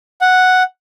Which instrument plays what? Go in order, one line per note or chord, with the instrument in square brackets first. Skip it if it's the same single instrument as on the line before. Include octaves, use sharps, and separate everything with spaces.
[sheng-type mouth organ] F#5